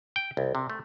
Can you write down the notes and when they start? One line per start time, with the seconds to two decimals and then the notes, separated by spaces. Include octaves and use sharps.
0.16 G5
0.37 C2
0.55 C3
0.70 A3